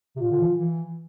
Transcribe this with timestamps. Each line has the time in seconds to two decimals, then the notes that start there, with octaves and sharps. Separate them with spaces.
0.16 C3
0.21 A#2 F4
0.31 D3
0.40 E3
0.58 E3